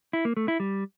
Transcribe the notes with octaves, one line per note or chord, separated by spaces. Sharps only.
E4
A#3
A3
E4
G3